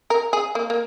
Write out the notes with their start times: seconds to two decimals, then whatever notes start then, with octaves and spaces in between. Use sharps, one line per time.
0.10 A#4
0.33 G#4
0.55 A#3
0.70 A#3